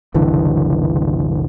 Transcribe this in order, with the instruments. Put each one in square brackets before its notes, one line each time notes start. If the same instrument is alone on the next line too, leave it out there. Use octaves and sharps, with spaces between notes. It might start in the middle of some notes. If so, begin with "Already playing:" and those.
[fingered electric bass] F#1 C2 D3 E3